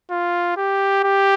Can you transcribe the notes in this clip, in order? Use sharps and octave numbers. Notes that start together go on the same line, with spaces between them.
F4
G4
G4